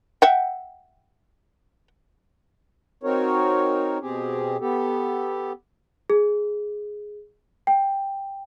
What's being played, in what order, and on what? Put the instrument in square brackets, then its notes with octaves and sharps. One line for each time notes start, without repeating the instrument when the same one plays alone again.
[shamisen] E5 F#5 G5
[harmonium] C4 D#4 F#4 A#4 C#5
B2 C4 G4 G#4
B3 G4 A4
[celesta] G#4
G5